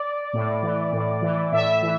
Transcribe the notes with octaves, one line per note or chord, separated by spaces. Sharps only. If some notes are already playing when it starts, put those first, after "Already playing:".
Already playing: D5
A2
E3
A2
E3
A2 E5
E3